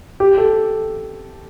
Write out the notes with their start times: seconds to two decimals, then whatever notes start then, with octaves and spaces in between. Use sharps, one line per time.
0.20 G4
0.38 A4